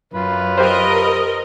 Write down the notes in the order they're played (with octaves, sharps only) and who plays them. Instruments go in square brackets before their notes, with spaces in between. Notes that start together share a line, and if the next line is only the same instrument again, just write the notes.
[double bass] F#2 [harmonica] F4 B4
[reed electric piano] G4 C5 [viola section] A#4 D#5